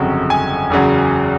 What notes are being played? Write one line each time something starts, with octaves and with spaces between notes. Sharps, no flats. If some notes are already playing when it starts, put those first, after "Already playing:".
Already playing: G1 F2 C#3 F#3
G#5
F#1 E2 C#3 F#3